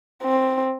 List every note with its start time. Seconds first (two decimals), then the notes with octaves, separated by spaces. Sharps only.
0.23 C4